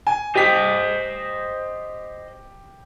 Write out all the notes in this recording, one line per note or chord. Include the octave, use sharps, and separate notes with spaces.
G#5
G4 C5 D#5 B6